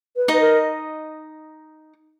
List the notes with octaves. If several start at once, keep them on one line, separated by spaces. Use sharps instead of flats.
B4
D#4 B4 D#5
A#4